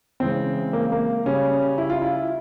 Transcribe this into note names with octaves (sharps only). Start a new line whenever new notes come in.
C#3 E3 G#3 C4
A#3
A#3
C#3 G3 C#4
E4
F4
E4